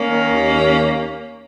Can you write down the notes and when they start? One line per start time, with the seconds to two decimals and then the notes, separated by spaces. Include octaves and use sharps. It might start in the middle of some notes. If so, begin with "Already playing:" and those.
Already playing: A#3 C#4
0.09 D#3
0.32 D#2
0.53 D#2